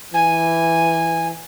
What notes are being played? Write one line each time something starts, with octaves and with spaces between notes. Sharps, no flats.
E3 G#5